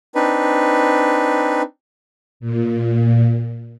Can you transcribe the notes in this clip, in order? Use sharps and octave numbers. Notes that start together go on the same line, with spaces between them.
C4 D4 D#4 B4
A#2